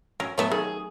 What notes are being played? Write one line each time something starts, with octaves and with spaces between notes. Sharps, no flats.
F#3 C#4 A#4
F#3 A3 B3 C#5 E5
D#3 G#4